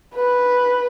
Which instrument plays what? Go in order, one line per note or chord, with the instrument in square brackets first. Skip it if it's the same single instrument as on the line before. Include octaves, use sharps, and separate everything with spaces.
[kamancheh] B4